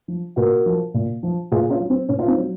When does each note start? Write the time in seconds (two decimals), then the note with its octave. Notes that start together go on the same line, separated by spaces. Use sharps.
0.08 F3
0.36 A#2 F#4 A#4
0.66 F3
0.94 A#2
1.23 F3
1.52 A#2 F4 G#4
1.70 C#4 F4
1.80 F#3
1.90 C4
2.09 A#2 C#4
2.19 F4
2.28 C4 D#4
2.38 F#3